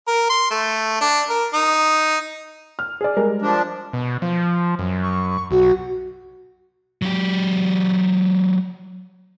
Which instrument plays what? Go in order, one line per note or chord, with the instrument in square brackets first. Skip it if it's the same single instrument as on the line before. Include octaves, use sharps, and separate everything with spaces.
[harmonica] A#4
C6
A3
D4
A#4
D#4
[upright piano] F6
G#4 D5
G3 G#3 A#4
[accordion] F3 D4
[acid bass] B2
F3
F#2
[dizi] C#6
[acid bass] B1 [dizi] F#4
[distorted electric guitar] F#3 G4